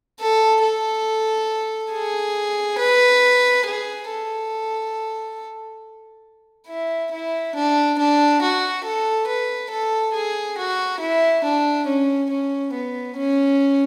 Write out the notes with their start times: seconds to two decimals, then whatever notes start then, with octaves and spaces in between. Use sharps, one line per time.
0.20 A4
0.62 A4
1.92 G#4
2.78 B4
3.65 G#4
4.09 A4
6.68 E4
7.12 E4
7.55 D4
7.98 D4
8.42 F#4
8.84 A4
9.27 B4
9.71 A4
10.14 G#4
10.58 F#4
11.00 E4
11.45 D4
11.87 C#4
12.30 C#4
12.74 B3
13.16 C#4